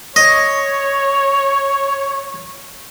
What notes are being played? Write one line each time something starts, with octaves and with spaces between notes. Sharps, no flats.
C#5 D#5